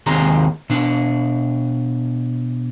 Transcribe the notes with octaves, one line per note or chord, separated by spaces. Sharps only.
D#2 C3 G#4 A#5 C6
B2 D4